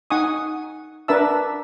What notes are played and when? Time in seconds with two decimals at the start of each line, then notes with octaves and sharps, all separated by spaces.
0.10 D#4 F#5 G#5 C#6 D#6
1.08 D4 A#4 B4 E5 A5 E6